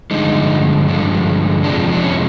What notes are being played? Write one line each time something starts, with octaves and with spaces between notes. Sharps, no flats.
G2 D3 F3 G#3 D#4
G2 D3 F3 G#3
F2 C3 F3 G#3 D4
D4
C#4